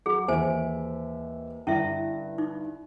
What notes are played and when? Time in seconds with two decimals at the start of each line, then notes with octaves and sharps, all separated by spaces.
0.06 F#3 G#4
0.28 D#2 E3 C5 E5 G#5
1.67 G2 D3 C#4 E4 E5
2.38 D#4